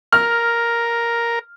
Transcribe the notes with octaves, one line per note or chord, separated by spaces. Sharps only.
A#4 F6